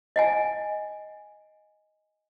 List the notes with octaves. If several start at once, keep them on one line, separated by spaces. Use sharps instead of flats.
D#5 F#5 G#5